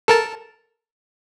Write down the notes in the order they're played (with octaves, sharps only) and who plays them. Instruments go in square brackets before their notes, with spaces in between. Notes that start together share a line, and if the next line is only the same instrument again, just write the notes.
[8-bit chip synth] A4 A#4 A5